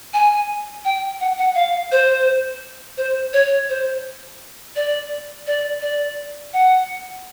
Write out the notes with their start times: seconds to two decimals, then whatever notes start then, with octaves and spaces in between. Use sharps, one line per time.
0.14 G#5
0.85 G5
1.20 F#5
1.38 F#5
1.55 F5
1.92 C5
2.97 C5
3.33 C#5
3.69 C5
4.76 D5
5.47 D5
5.82 D5
6.53 F#5